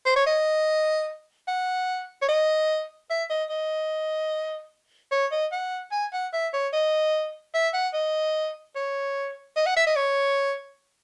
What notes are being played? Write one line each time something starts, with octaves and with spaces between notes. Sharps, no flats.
C5
C#5
D#5
F#5
C#5
D#5
E5
D#5
D#5
C#5
D#5
F#5
G#5
F#5
E5
C#5
D#5
E5
F#5
D#5
C#5
D#5
F#5
E5
D#5
C#5